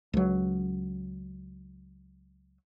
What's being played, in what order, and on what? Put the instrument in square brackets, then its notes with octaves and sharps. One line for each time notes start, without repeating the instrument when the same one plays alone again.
[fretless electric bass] C#2 F#3